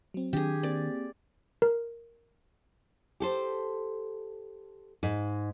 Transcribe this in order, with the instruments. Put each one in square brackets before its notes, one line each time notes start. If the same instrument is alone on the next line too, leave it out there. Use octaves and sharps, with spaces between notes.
[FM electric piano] F#3 C4
[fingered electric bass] D#3 D4 [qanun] G4 G#4
[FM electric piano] A#3 C4 G4 [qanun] D5
[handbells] A#4
[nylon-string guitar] G4 A4 C5
G#2